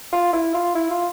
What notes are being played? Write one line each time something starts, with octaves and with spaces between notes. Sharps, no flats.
F4
E4
F4
E4
F4